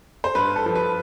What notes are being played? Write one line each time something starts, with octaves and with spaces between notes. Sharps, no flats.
C5
G2 B4
A4
F3
B4